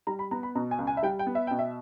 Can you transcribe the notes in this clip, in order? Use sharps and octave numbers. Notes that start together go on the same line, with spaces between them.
G3 A#5
B5
B3 A#5
B5
B2 A#5
G#5
C#2
G#5
E5
G3 G5
G5
B3
E5
B2 G5
E5